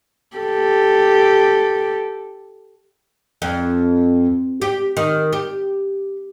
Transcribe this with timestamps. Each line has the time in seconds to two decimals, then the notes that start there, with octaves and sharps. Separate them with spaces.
0.37 G4 A4
3.42 F2
4.62 G4
4.97 D#3
5.33 G4